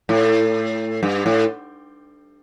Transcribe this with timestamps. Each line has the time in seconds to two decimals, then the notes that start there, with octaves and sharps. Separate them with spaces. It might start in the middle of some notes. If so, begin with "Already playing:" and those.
0.09 A2
1.03 G2
1.26 A2